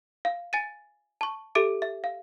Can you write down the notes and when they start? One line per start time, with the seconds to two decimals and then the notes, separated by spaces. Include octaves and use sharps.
0.25 F5
0.53 G#5 A6 D#7
1.21 A5 C#6
1.55 G4 A4 E5 D6 D7
1.82 E5
2.04 F5